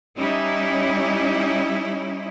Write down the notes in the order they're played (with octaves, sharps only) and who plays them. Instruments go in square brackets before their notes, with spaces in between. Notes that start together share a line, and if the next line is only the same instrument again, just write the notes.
[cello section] G3 C#4 D#4 E4